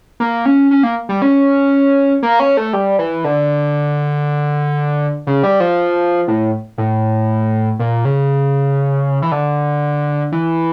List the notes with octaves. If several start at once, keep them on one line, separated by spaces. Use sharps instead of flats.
A#3
C#4
C#4
A#3
G3
C#4
A#3
C#4
A3
G3
E3
D3
C#3
G3
F3
A2
A2
A#2
C#3
E3
D3
E3